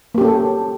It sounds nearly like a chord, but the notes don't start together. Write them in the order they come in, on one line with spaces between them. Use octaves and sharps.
A#3 G4 C#4 A4